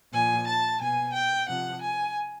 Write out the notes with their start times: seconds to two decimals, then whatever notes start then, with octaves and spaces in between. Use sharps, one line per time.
0.12 A#2 F3 G#5
0.47 A5
0.80 B2 G#5
1.14 G5
1.47 C3 F3 F#5
1.81 G#5